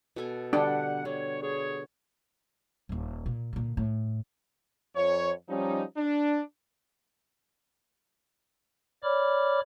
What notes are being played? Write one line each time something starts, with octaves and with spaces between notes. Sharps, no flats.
B2 A4 G#5
D3 G3 D4 F#5 G5
D3 C#5
G#4 C#5
D#1 D#2
A#2
A#2 D3
A2
F2 C#5
F3 G3 C#4 D#4
D4
C#5 D5 B5 D6 F6